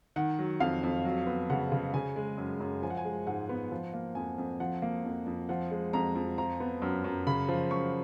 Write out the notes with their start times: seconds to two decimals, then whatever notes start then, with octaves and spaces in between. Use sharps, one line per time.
0.16 D#3 F#5
0.39 F#3
0.60 F2 F5
0.83 F2
1.05 F#3
1.27 B3
1.50 C#3 F#5
1.72 C#3
1.94 C#3 G#5
2.16 G#3
2.38 F#2
2.60 F#2
2.82 F3 G#5
2.90 F#5
2.97 G#5
3.05 G#3
3.27 G#2 F#5
3.49 B3
3.71 F3
3.93 A#3
4.15 F2 G#5
4.38 F2
4.60 F3 F#5
4.82 A#3
5.05 F2
5.26 F2
5.49 F3 F#5
5.71 G#3
5.93 F2 A#5
6.15 F2
6.38 F3 A#5
6.60 B3
6.82 F#2
7.04 F#2
7.27 C#3 B5
7.48 F3
7.71 F#2 C#6